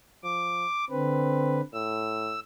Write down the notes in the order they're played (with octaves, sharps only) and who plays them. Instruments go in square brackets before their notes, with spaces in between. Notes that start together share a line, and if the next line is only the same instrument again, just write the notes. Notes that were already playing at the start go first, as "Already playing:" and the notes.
[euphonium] F3 [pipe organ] D6
[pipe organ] D3 B4 [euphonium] C4
[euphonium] A2 [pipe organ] E6